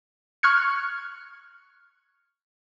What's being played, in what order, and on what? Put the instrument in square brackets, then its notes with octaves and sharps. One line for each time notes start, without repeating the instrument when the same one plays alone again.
[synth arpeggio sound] C#6 F6 F#6 G#6 C#7